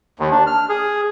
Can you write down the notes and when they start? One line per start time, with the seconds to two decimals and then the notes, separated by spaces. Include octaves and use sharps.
0.19 D#2
0.32 D4
0.47 F6
0.69 G#4